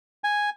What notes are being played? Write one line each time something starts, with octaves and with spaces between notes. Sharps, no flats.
G#5